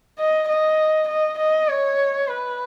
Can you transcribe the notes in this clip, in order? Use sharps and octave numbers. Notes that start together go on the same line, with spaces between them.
D#5
D#5
D#5
D#5
C#5
B4